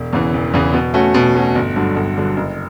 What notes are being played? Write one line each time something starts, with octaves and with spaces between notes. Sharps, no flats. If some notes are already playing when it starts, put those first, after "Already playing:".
Already playing: E1
E2 C#3 E3
E1
E2 C#3 E3
B2
A3 C#4 F#4
B2
A3 C#4 F#4
G1
G2 D3 F#3
G1
G2 D3 F#3
F#1